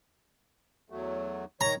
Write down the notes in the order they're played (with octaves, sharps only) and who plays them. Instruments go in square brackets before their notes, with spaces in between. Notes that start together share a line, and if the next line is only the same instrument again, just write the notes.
[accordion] E2 F#3 A3
[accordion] D#3 C#5 [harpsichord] A#5